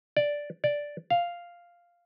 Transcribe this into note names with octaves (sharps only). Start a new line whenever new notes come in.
D5
D5
F5